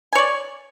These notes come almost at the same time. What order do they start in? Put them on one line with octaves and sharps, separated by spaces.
G#5 C#5 D5